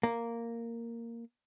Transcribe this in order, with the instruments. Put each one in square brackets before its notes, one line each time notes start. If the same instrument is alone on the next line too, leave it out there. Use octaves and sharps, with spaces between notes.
[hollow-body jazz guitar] A#3